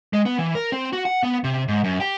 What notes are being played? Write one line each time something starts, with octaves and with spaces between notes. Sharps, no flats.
G#3
B3
E3
A#4
C4
F#4
F#5
B3
C3
G#2
F#2
G4